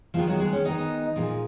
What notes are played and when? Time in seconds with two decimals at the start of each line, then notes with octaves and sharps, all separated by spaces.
0.14 D#3 F3 G#3 B3 F4
0.27 F#3 F#4
0.40 G#3 G#4
0.53 C#4 C#5
0.65 D#3 G#3 B3 D#4 D#5
1.16 A#2 F3 G#3